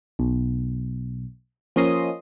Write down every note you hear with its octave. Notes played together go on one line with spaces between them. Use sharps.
B1
F3 A#3 C#4 D#5 C6 D#6